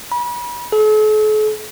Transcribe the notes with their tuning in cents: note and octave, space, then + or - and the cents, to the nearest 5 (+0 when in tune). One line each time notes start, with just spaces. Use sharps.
B5 -35
A4 -45